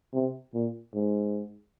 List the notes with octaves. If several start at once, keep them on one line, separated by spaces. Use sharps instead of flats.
C3
A#2
G#2